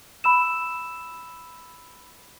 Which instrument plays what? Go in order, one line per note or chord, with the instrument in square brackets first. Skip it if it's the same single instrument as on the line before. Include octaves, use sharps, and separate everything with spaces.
[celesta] B5 E6 E7